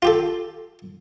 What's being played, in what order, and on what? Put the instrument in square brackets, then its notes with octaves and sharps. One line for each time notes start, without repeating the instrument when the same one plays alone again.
[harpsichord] F4 G4 A4